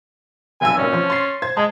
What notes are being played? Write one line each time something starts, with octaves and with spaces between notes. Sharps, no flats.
F1 B1 G#5 E6
C2 A#2 C#4
F3 C5
C6 A6 C7
C5 G#6
G#3 A5